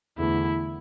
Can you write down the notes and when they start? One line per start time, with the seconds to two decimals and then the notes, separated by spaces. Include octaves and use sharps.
0.18 E2 D3 A3 E4